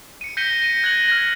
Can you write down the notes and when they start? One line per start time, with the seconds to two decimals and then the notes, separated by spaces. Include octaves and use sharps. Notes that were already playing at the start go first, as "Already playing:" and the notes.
0.21 C#7 D#7
0.37 G6 A#6 B6 C#7 D#7 G7
0.62 A#6 D#7
0.83 F#6 G#6 A#6 C#7 F#7
1.08 F6 G#6 A#6